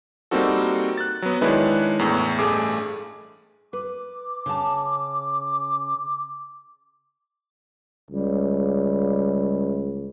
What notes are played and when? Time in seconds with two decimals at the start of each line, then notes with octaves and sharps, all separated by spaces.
0.31 G3 A#3 C4 D#4 F#4 A4
0.97 F#6 A6
1.22 F#3 B3
1.41 D#3 G#3 D4 E4 B4 C#5
1.99 E2 A2
2.39 A1 G2 A3 G#4 D6
3.73 B4 D6
4.46 C#3 A5
8.11 C#2 G3